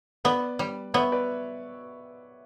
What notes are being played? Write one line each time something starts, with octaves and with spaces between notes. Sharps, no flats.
B3 B4 D5
G3
B3 C#5 E5
B4 D5